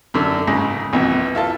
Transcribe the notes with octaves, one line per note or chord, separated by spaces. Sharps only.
F#2 D3
C#2 G#2 C#3
A#1 F2 B2 E3
E4 F4 A4